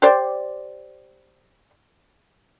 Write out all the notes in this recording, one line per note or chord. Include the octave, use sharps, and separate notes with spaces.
G4 C5 D5